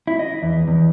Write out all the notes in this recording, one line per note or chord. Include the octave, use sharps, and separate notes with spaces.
E4
D#5
E2
E2